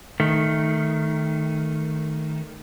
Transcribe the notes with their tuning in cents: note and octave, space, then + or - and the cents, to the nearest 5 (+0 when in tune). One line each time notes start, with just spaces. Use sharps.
D#3 +0 A3 +0